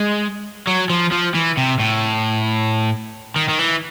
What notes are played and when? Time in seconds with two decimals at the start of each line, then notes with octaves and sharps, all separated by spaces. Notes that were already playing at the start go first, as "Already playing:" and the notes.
Already playing: G#3
0.67 F#3
0.90 F3
1.12 F3
1.35 E3
1.57 C3
1.79 A2
3.36 D#3
3.49 D#3
3.59 E3